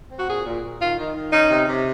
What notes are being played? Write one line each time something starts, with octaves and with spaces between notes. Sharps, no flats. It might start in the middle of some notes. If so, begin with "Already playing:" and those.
C4
F#4
A#2 G#4
A#2
A#2
D#3 F4
D#3
D#3
C#4 D#4
C3
C3